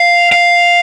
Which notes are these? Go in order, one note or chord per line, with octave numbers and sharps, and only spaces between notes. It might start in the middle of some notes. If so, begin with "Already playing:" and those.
Already playing: F5
F5